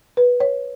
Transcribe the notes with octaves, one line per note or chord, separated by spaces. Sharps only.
B4
C#5